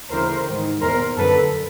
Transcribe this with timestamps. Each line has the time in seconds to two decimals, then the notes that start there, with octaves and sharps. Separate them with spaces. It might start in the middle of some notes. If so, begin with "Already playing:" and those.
0.11 D2 C#3 E3 A#4 C5
0.46 G#2 D#3
0.82 E2 B2 A#4 C5
1.17 F#2 D3 A4 B4